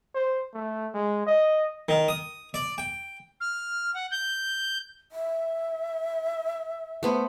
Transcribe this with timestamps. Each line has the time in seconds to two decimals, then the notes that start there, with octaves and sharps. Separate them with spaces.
0.15 C5
0.54 A3
0.94 G#3
1.27 D#5
1.89 D#3
2.08 D#6
2.54 D5
2.78 G5
3.40 F6
3.94 F#5
4.11 G6
5.12 E5
7.03 A3 B3 C5